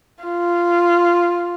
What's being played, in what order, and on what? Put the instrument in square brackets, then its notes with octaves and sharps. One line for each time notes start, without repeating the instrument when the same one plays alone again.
[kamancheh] F4